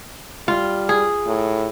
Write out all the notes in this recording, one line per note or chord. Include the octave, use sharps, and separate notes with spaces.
G3 F4
G#4
A2